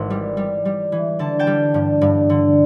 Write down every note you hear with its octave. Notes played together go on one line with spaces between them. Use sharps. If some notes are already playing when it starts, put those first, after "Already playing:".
Already playing: G#1 E3
G3
G3
G3
E3
D3 A5
G5 A5
G3
G2
G2
D3